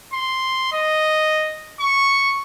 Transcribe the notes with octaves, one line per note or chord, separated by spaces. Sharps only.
C6
D#5
C#6